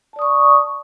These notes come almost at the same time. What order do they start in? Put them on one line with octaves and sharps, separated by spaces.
A5 D5 D#6 C#6